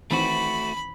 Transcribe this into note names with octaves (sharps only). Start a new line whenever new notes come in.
D#3 E3 A3 C4 F#4 B5